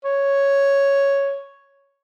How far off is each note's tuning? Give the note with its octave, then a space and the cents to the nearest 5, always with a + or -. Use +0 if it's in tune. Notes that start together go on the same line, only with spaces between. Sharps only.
C#5 +0